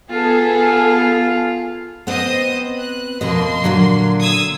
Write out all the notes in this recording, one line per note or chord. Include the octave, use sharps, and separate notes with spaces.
B3 F4 G#4 A4
B3 C4 C5 D#5 D#6
F#6
F2 B2 A#3 D#5 C6
A#2 D3 F#3
D#6 E6 G#6